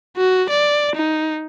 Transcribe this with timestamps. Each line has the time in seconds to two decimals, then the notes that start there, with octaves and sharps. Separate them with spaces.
0.17 F#4
0.50 D5
0.95 D#4